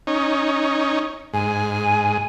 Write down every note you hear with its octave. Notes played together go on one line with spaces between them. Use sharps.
C#4 D#4
G#2 G#5